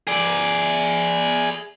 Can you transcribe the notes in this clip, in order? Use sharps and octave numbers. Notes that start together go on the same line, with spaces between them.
G#4 D5